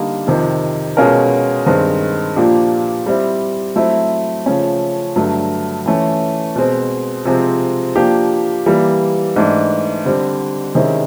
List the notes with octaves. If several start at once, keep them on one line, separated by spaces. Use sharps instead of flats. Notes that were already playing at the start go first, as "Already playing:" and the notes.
Already playing: D3 G3 A#3 D#4
F2 C3 D#3
B2 G#3 C#4 F4 A#4
G2 D#3 G#3 C4
A#2 F3 A#3 D4 G4
G3 C4 E4
F#3 A3 C4 E4
C#3 F3 A3 C#4
G2 D3 F#3 A3
E3 A3 C#4
B2 G#3 C4
C3 F3 G#3 C4
F3 A#3 D4 G4
E3 G3 A#3
G#2 E3 A3 D4
D3 G3 C4
C3 D#3 G#3 C#4 E4